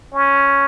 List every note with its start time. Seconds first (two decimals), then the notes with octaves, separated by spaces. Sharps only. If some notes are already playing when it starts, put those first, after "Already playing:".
0.14 C#4